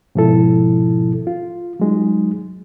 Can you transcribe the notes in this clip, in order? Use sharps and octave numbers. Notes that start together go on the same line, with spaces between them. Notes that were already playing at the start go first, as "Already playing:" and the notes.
G#2 B2 F3 E4 A4
F4
F#3 G#3 D#4